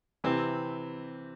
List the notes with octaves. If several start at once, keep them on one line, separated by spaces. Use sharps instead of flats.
C3 E3 C4